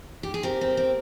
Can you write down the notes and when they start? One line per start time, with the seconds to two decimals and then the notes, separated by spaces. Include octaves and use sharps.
0.23 G4
0.34 G#4
0.43 C4 G4 A#4
0.61 C4
0.77 C4